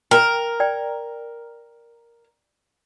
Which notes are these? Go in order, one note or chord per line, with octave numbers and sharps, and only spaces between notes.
A#4 G5 A#5
D5 G5